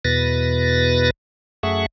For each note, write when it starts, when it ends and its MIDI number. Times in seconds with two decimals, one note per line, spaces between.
0.05 1.10 40
0.05 1.10 47
0.05 1.10 71
0.05 1.10 93
0.05 1.10 94
1.63 1.86 42
1.63 1.86 57
1.63 1.86 68
1.63 1.86 76
1.63 1.86 78
1.63 1.86 85